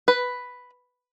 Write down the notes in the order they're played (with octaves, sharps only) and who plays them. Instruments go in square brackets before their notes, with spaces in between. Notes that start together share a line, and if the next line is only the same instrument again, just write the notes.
[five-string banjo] B4